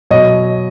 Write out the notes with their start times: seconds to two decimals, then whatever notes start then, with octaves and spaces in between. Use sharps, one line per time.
0.11 B2 F#3 C#5 D#5